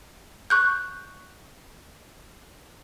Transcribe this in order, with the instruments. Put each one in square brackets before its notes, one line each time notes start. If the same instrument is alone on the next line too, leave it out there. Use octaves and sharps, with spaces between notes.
[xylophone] C#6 F#6 G6